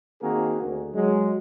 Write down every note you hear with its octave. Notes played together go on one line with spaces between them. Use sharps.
D#3 A#3 C4 F#4 G#4 A#4
D2
F#3 G#3